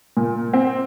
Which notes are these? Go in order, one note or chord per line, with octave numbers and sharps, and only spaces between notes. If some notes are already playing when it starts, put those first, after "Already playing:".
A#2
C4